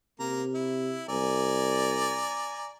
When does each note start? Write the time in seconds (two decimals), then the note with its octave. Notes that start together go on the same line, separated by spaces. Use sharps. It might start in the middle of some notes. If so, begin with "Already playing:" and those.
0.20 C3 A#3 A#5
0.55 E4
1.09 C2 D5 G#5 A#5